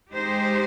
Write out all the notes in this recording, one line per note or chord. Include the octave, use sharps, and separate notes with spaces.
G#3 D#4 G4 C5